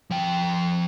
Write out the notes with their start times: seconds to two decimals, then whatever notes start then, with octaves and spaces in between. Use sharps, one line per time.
0.11 F3 G5